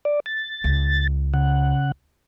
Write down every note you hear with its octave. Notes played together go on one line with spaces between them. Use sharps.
D5
A6
C#2
C#3 F#5